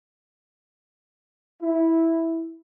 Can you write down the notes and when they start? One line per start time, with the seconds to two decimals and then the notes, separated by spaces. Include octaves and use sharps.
1.61 E4